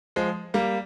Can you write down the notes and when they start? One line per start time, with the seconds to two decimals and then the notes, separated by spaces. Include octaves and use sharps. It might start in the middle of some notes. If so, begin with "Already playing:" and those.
0.16 F3 G#3
0.54 G3 A#3